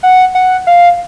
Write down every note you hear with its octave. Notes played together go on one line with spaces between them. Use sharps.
F#5
F#5
F5